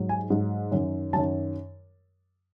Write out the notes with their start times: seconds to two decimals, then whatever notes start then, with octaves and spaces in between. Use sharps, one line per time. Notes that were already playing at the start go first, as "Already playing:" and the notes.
Already playing: G#2 F#3
0.09 G#5
0.30 G#2 F#3
0.72 F#2 D#3 F#3
1.13 F#2 D#3 F#3 A5